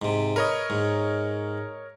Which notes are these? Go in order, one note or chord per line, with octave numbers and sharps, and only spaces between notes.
G#2 C3
A#4 B4 C#5 D#5
G#2